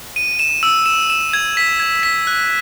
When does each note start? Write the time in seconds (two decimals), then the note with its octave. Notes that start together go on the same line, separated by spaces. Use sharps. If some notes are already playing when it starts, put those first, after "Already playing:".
0.16 D#7
0.39 E7
0.63 E6
0.86 E7
1.10 E7
1.33 G#6
1.57 B6
1.80 G#6
2.03 B6
2.27 F#6